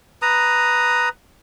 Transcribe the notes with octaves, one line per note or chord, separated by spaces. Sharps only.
B4 A#5 D#6